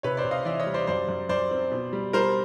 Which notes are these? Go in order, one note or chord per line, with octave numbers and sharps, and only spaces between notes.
C3 B4 C#5
C5 D5
C3
D#5 F5
E3 D5 E5
C#5 D#5
G3
C5 D5
F#2 C5 D5
F#2
F#2 C5 D5
C4
B2
G3
G3 A#4 C5